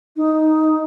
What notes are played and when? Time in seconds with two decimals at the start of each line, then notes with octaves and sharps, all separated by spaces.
0.17 D#4